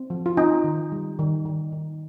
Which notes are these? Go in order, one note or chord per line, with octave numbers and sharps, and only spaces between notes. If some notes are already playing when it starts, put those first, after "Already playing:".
Already playing: C4
F3
F4
C4 D#4
D#3
G3
D#3
D#3
D#3